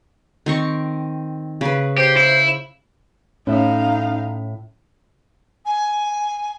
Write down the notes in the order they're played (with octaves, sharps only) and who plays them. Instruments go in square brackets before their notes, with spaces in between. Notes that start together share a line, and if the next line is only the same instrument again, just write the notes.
[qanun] D#3 C4 C#6
C#3 B4
[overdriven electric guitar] G4 [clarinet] C5
[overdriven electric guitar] E4
[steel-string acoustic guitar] A2 E5 [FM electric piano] C#4 [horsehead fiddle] D#4 F5
[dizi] G#5